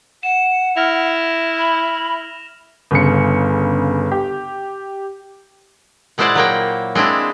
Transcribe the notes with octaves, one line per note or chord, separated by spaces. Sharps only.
F#5 E7
E4 F6 A#6 F7
B5
G1 C#3 C#7
G4
A#2 G#3 E4 C5 D5 F#5
F#3 A#3 G5
G#3 C4 D4 E4